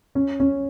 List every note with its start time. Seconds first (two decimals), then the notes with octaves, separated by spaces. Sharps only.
0.15 C#4
0.40 C#4